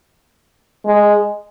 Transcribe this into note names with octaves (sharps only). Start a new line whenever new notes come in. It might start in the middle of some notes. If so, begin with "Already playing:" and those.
G#3